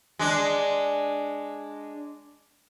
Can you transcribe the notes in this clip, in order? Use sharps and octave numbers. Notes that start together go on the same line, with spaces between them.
G#3 D4